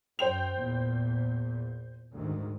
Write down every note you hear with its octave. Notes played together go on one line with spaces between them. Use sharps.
F#2 C5 G5 F7
E2 A#2
D2 G#2 D#3